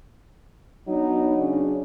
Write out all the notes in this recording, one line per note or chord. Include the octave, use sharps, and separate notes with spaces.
F#3 B3 D4 D#4
C#3 C#4 D4